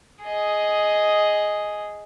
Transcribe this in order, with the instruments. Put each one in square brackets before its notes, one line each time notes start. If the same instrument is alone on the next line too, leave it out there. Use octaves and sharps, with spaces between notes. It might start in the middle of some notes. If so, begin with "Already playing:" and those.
[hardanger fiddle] G#4 D#5